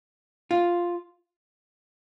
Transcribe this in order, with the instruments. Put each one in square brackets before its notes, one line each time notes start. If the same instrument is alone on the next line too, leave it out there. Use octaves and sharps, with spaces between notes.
[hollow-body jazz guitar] F4